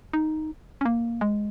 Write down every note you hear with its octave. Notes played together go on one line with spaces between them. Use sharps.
D#4
C#4
A#3
G#3